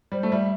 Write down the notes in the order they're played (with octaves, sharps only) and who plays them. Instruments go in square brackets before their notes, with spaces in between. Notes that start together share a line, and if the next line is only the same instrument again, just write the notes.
[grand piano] G3 [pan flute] C5
[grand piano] A3
[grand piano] G3 [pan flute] E5